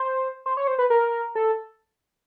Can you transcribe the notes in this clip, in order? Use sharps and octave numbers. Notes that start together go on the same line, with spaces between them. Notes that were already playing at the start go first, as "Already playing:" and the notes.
Already playing: C5
C5
C#5
C5
B4
A#4
A4